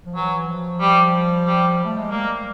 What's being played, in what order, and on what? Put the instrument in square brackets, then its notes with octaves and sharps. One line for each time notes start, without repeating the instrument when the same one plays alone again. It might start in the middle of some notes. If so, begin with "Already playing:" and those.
[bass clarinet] F3
[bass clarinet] E3 [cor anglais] F#3
[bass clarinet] F3
[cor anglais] G3
G3
[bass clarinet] A3
G#3
[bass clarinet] G3 [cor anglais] A#3